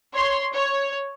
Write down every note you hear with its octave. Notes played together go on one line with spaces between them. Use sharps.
C#5 C6
C#5